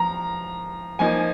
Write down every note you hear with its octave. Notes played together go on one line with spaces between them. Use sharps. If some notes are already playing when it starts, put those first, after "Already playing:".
Already playing: F3 A#5
F3 A#3 D#4 G#5